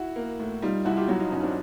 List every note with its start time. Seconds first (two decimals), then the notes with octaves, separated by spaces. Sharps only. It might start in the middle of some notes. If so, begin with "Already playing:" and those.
Already playing: E4 F#4
0.16 A#3
0.40 A2
0.62 G3 D#4 F4
0.85 C2 E4 F#4
0.97 F4 G4
1.08 F#3 E4 F#4
1.20 D#4 F4
1.32 G2 C#4 D#4
1.43 C4 D4